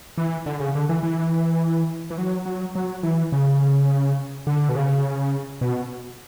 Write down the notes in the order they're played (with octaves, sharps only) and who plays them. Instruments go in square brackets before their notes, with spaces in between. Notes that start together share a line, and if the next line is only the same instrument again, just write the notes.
[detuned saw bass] E3
D3
C#3
D3
E3
E3
E3
F#3
F#3
F#3
E3
C#3
D3
B2
C#3
B2